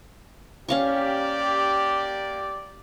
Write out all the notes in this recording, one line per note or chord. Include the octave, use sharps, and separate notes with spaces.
A#3 C#4 G4 D5 F5 C#6